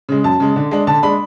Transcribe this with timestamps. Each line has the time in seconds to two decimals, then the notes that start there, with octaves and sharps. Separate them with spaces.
0.09 C#3 G#3
0.24 F#2 A5
0.40 C#3 G#3
0.56 D3
0.71 G#3 D4
0.87 D3 A5
1.03 G#3 D4 B5